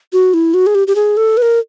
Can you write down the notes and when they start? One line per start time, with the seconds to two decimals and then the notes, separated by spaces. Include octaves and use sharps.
0.13 F#4
0.34 E4
0.54 F#4
0.67 G#4
0.75 G4
0.87 G4
0.96 G#4
1.17 A4
1.37 B4
1.42 A#4